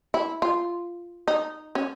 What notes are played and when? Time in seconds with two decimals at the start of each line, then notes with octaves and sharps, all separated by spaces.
0.14 E4
0.42 F4
1.28 D#4
1.75 C#4